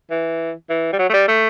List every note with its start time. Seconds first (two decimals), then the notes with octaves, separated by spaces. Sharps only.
0.11 E3
0.70 E3
0.93 G3
0.99 F#3
1.09 A3
1.13 G3
1.28 A3